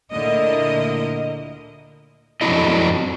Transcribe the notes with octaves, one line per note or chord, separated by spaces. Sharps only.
D2 A#2 D3 E4 A#4 D#5
F2 F#3 A#3 D4 E4 D#5